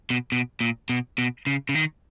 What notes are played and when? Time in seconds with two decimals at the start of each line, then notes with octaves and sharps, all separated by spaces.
0.10 B2
0.32 B2
0.60 A#2
0.89 B2
1.18 B2
1.47 C#3
1.69 C#3
1.75 D#3